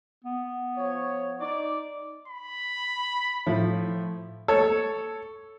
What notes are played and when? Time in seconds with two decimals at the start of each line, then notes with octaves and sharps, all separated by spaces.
0.24 B3
0.76 F3 C#5
1.41 D#4 D5
2.28 B5
3.46 A2 F3
4.48 A4 C#5